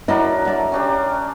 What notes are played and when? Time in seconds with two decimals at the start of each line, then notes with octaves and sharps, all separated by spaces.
0.08 F#3 D4 E4 A#4 D#5
0.45 D3 D5 E5
0.72 C#4 D4 G4